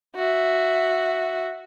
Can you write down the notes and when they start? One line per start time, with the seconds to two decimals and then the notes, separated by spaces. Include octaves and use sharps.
0.16 F#4 E5